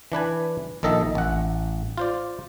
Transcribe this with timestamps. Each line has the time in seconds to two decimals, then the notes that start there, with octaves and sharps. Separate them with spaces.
0.12 E3 D4 B4 G#5
0.83 A#1 D#3 A4 D#5 E5 A5
1.15 A1 F#5
1.98 F4 C5 D5